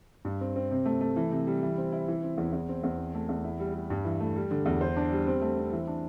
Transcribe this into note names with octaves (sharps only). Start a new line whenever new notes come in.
G2
C4
C4
C3
A3
A3
E3
C3
G3
E3
C4
E4
E3
C4
E2
E2
C4
E2
C4
A3
E2
E4
G3
G3
G2
E3
A3
G3
D3
E2
C5
D4
G3
C4
A3
C4
E3
D4